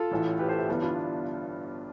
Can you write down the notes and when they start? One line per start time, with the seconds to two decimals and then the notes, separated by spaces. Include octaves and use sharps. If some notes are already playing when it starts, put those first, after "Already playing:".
Already playing: F4 A4
0.11 A1 A2 E3
0.39 G4 B4
0.49 A4 C5
0.59 C5 E5
0.68 G1 G2 E3 G3 B3
0.82 D4 F4